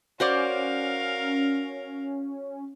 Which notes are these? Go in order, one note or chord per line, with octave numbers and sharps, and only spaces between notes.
C#4 F#4 A#4 C5 D5 F5